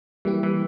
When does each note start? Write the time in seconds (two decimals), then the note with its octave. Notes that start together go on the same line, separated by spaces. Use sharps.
0.25 E3 G3 A#3 E4 G4
0.43 E3